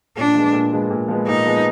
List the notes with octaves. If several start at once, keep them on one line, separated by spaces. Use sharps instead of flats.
A#2 D4
F3 G#3 B3
A#2
F3 G#3 B3
A#2
F3 G#3 B3
A#2 D#4
F3 G#3 B3